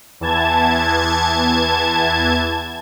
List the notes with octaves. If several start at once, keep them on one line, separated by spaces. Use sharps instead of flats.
E2 E3 A5 G#6